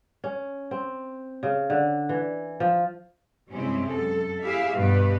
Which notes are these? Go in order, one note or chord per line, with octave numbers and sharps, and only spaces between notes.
C#4
C4
C#3
D3
E3
F3
G2 C3 G#3 C4 C#4 E4
F#2 A4
E4 G4 G#4 E5 F5
G2 B2 G3 G4 B4